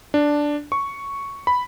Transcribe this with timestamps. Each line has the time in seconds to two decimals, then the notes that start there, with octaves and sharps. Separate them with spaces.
0.14 D4
0.72 C#6
1.47 B5